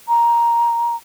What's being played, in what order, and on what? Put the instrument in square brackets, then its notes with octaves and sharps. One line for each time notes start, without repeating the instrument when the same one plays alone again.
[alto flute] A#5